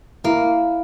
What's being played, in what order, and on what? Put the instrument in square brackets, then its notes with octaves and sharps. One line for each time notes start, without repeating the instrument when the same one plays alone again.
[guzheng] A#3 [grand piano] E4